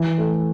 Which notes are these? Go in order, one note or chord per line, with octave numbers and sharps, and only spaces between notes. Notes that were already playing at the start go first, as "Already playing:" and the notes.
Already playing: E3
A3